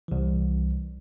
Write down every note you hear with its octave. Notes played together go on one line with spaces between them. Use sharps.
C2 E3